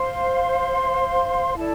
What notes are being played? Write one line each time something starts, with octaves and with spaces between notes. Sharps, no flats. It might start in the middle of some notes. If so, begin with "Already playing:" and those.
Already playing: C5 F5 C6
E4 A4 D5 A5